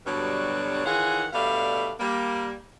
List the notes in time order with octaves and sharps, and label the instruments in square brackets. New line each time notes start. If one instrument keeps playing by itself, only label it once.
[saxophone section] G2 B2 D3 F#3 G3 D4
D#3 E3 F4 G#4 C#5 F#5
B2 G3 A3 D4 F5
G3 A#3